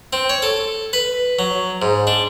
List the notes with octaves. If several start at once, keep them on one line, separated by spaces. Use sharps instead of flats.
C4
C#5
A4
B4
F#3
G#2
D4